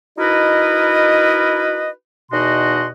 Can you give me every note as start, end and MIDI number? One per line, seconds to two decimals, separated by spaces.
0.18 1.90 63
0.18 1.90 64
0.18 1.90 66
0.18 1.90 70
0.18 1.90 71
0.18 1.90 75
2.32 2.88 40
2.32 2.88 47
2.32 2.88 63
2.32 2.88 66
2.32 2.88 75
2.32 2.88 84